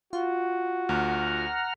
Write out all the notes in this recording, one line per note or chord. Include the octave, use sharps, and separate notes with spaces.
F4 F#4
D2 F#5 A#5 F6